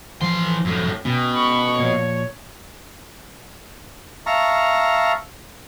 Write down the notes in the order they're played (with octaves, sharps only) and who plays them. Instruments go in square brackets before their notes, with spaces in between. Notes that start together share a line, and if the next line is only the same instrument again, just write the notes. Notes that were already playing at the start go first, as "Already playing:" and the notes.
[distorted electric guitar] E3 C6 [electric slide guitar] F3
[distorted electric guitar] F#2 A2
[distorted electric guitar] B2 [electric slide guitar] C#4 G5
[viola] B5 C#6
[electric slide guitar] A#2 F3 [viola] C#5
[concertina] E5 F5 A5 A#5 C#6